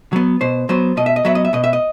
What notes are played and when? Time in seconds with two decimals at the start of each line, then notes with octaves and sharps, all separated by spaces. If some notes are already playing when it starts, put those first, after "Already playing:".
0.13 F#3 B3
0.41 B2 C5
0.69 F#3 B3 C5
0.97 B2 D#5
1.06 E5
1.16 D#5
1.25 F#3 B3 E5
1.35 D#5
1.45 E5
1.53 B2 D#5
1.64 E5
1.73 D#5